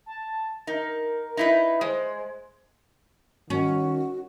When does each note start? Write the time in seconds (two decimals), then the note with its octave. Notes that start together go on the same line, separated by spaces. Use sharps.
0.06 A5
0.67 D#4 A#4
1.37 D#4 E4 B4
1.81 G#3 C5
3.50 D#3 C#4 F#4